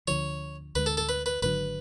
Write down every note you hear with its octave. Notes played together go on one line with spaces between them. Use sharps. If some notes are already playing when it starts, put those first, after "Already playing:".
D2 D3 F3 C#5
D2 D3 G#3 B4
A4
A4
B4
B4
G#1 F#2 D3 F#3 B4